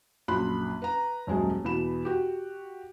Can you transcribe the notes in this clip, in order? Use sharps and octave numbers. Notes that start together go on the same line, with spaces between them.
A#1 F#2 B5 C6 F#6
B4 A#5
D#1 F#2 G#3 G#4
E2 B2 B5 E7
F#4 G4